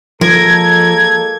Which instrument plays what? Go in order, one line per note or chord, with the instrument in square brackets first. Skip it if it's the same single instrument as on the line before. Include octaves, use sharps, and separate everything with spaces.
[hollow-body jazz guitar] F3 [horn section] G#3 A#3 A4 [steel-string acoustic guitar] A#4 [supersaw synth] G#6